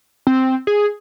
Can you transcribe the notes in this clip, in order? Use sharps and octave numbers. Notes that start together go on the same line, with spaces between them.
C4
G#4